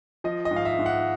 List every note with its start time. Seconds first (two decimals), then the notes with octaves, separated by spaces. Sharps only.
0.24 F3 D#5
0.45 D#5
0.51 G#2
0.56 F5
0.65 E5
0.79 G#2
0.86 F#5